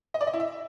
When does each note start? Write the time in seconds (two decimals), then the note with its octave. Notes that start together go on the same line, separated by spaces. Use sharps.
0.14 D#5
0.21 D5
0.27 D#5
0.33 E4
0.40 E5